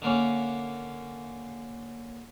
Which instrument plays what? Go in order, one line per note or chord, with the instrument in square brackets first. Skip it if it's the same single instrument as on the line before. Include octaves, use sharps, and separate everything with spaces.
[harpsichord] D3 A#3 C#4